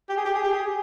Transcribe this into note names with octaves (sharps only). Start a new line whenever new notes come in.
G4
G#4
G4
G#4
G4
G#4